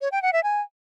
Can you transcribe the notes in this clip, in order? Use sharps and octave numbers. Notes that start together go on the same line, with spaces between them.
C#5
G5
F#5
E5
G#5